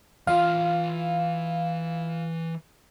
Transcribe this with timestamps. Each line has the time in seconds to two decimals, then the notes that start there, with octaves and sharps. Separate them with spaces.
0.27 E3 F4 F5 C6